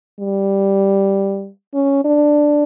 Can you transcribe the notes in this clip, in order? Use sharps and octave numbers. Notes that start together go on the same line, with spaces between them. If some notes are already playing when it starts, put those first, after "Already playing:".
G3
C#4
D4